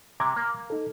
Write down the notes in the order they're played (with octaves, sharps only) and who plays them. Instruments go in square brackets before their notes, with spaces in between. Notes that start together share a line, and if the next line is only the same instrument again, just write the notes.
[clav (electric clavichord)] C3 [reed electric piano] A#5 D6 G#6
[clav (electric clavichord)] A#3
[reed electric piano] D#4 A4